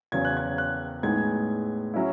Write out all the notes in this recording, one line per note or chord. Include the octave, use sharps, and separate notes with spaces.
E2 C#3 F#3 C#4 G#6
F#6
G#6
F#6
A2 G#3 B3 D#4 G#6
F#3 C#4 E4